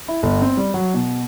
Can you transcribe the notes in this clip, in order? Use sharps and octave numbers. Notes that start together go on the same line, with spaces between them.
E4
G1
C4
G3
F#3
B2